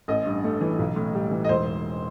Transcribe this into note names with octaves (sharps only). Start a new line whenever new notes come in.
A1 D#5
G2
A3
E3
B1
A2
G3
E3
D#5
E1 C5